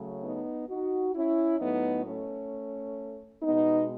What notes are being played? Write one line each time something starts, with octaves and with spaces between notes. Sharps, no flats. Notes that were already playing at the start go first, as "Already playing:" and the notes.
Already playing: C#3 F#3 A3
B3 D#4
D#4 F#4
C#4 E4
A2 F#3 A3 B3 D#4
A3 C#4
B2 G#3 B3 D#4